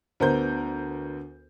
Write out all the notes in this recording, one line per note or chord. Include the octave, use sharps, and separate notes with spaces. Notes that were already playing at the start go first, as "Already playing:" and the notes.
D2 B3 A#4 C5 G6